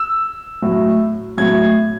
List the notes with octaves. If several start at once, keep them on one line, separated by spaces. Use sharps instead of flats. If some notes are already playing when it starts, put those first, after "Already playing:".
Already playing: E6
A2 F#3
A2 F#3 G#6